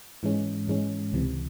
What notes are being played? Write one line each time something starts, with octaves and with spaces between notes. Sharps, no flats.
G#2 E3 G#3 C#4
G#2 E3 G#3 C#4
C#2 C3 E3